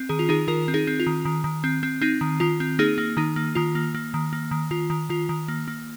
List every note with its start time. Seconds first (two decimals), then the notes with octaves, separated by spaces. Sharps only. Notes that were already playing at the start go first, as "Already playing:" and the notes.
Already playing: C4
0.09 D#3 G#4
0.19 F4
0.29 D#3 D#4 G#4
0.48 D#3 F4 A#4
0.68 C4
0.74 D#4 G#4
0.87 C4
1.00 F4
1.07 D#3
1.25 D#3
1.44 D#3
1.64 C4
1.83 C4
2.01 C4 D#4
2.21 D#3
2.40 D#3 F4
2.60 C4
2.79 A#3 D#4 G#4
2.98 A#3
3.17 D#3 D#4
3.36 A#3
3.55 D#3 F4
3.75 A#3
3.95 A#3
4.14 D#3
4.33 A#3
4.51 D#3
4.71 D#3 F4
4.90 D#3
5.09 D#3 F4
5.29 D#3
5.48 A#3
5.68 A#3